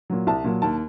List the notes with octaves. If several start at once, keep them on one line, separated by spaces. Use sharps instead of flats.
A#2 F#3
C2 A5
A#2 F#3
D#2 A5